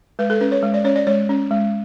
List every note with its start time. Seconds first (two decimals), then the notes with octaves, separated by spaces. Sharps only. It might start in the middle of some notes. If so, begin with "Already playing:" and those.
0.19 G#3 B4
0.30 A4
0.41 C#4 B4
0.52 C#5
0.63 G#3
0.74 D5
0.84 C#4 C#5
0.96 D5
1.07 G#3 C#5
1.29 C#4
1.51 G#3